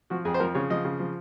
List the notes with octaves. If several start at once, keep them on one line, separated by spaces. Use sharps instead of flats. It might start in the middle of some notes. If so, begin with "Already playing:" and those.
F3 F#4
F2 G#4
C5
F3 A#4
C#3 C#5
F3 D#5
C#3
F3